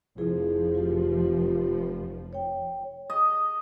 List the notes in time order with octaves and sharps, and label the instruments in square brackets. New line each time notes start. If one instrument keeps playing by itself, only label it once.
[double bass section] F1 F3 [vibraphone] E4 G#4
[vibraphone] F4 G4
C#5 G5
[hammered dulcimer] D#5